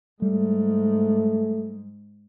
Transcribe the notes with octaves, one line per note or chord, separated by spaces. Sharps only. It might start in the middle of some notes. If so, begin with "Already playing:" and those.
G#2 G3 A3